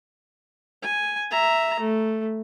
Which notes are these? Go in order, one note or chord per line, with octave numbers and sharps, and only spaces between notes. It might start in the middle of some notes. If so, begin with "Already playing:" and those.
G#5
E5 A#5
A3